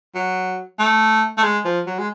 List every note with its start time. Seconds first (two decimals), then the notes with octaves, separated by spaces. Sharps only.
0.15 F#3
0.79 A3
1.38 A3
1.43 G#3
1.64 F3
1.87 F#3
1.98 G#3